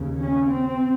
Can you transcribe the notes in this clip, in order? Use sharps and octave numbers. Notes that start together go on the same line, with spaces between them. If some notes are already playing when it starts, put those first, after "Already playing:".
Already playing: D#2 C#3
C#4
C4